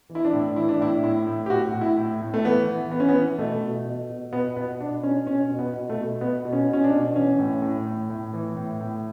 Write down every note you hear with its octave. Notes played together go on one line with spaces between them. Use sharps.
E3
E4
D4
A2
E3 E4
D4
A2 E4
A2 E4
A2
G4
A2 F#4
A2
E4
A2
A2
A3
E3 B3
E3
E3 B3
C#4
B3
E3
B2 A3
B2
B2
B2
B2 B3
B2 B3
B2 D4
B2 C#4
B2 C#4
B2
B3
B2
A3
B2
B2 B3
B2
C#4
B2
C#4
D4
B2
E3 C#4
A2
A2
A2
A2
E3
A2
A2